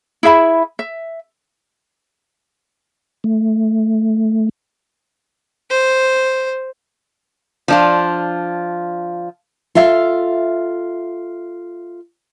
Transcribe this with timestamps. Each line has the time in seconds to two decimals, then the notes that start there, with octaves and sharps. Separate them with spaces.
0.23 E4 G#4 E5 B5
0.79 E5
3.24 A3
5.70 C5
7.68 F3 D4 F4
9.75 F4 A4 E5 F5